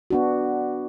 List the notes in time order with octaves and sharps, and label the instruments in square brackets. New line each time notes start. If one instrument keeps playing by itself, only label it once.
[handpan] B3 D4 F#4